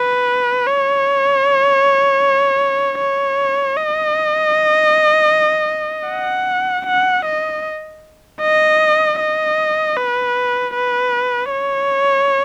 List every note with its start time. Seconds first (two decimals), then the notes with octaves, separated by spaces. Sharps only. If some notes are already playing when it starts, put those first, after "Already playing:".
Already playing: B4
0.67 C#5
2.99 C#5
3.77 D#5
6.09 F#5
6.87 F#5
7.26 D#5
8.41 D#5
9.19 D#5
9.97 B4
10.74 B4
11.51 C#5